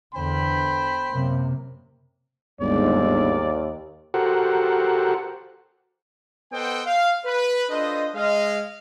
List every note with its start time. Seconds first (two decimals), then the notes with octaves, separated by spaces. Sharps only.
0.14 E2 D3 C5 G5 B5
1.11 F#2 C3 A#3
2.61 G1 D#2 G#2 D5
4.14 F#4 G4 A4 A#4 C5 F#5
6.52 B3 A4 C5 D#5 F#5 G5
6.86 F5
7.25 B4
7.70 D4 F4 A4 B4 C5 D#5
8.14 G#3 D#5 F5